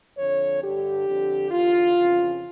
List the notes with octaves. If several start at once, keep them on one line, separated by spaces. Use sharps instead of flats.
F2 D3 C#5
G2 D3 G4
F2 D3
E2 D3 F4
F2 C#3 E3